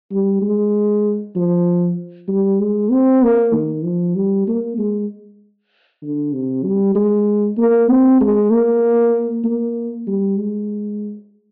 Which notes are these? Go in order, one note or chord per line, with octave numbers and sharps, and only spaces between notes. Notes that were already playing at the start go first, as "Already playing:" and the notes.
G3
G#3
F3
G3
G#3
C4
A#3
D#3
F3
G3
A#3
G#3
D3
C3
G3
G#3
A#3
C4
G#3
A#3
A#3
G3
G#3